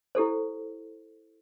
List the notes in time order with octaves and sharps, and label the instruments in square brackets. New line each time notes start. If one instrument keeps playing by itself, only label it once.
[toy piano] E4 G4 A4 C5